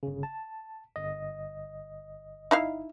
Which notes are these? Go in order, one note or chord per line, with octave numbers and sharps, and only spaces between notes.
G1 C#3
A5
G1 D#5
D#4 E4 F5